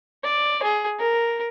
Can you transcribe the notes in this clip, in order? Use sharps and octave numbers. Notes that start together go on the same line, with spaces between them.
D5
G#4
A#4